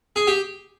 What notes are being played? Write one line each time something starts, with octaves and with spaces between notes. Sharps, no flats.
G#4
G4